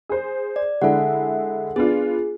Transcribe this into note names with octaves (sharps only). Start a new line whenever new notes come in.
G#4 C5
D5
D3 G#3 E4 A4 F#5
B3 D4 F4 G#4